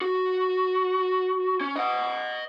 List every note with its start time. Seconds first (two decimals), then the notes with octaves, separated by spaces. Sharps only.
0.01 F#4
1.61 C#4
1.76 D#5 F#5